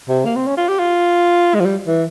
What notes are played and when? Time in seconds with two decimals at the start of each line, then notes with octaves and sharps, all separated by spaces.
0.09 C3
0.25 A#3
0.36 C4
0.47 C#4
0.57 F4
0.68 G4
0.79 F4
1.54 G#3
1.60 F3
1.65 G3
1.87 E3